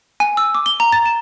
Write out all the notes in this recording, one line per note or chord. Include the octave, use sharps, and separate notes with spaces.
G#5
E6
D6
G7
A#5
A6
E7